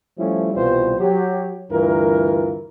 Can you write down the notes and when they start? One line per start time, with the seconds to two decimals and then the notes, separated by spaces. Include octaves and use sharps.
0.18 F3 G3 A3 C#4 E4
0.54 C2 B2 E3 G3 F4 C5
1.00 F#3 G4
1.71 D2 G2 E3 F4 A#4